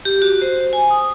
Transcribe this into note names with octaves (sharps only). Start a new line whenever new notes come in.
G4
F#4
C5
G#5
D#6